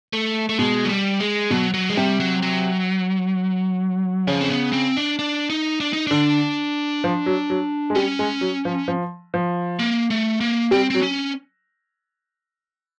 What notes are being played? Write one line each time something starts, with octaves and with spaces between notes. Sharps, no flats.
A3
A3
B2 G#3
F#3
G3
G#3
B2 F#3
F#3
G#3
C3 G3
F#3
F#3
C#3 F3
C4
B3
C4
D4
D4
D#4
D4
D#4
D3 D4
F3
F#3
F#3
G#3
G3 C#4
G#3
F#3
F3
F3
F3
A#3
A3
A#3
G3 C4
F#3 C4
C#4